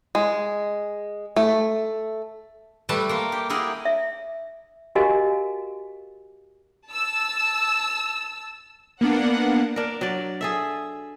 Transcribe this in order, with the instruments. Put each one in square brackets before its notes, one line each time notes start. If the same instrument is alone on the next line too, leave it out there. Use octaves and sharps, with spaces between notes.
[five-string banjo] G#3
A3
[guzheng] G3 A3 B4 E5 A5
A#3 F4
G4
E4 G4 G#4 A#4 F#5
[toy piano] E5
F#4 G4 A#4 D#5 F5 G#5
[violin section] A5 E6
[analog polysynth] A#3 B3 D4 [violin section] F#5
[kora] D4 A#4
F#3 D5
G#4 A4 E5